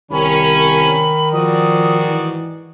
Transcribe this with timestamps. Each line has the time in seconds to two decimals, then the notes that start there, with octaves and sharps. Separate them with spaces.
0.11 C2 D#3 C#4 B5
1.33 G#2 F3 F#4 D5 D#6
2.07 E3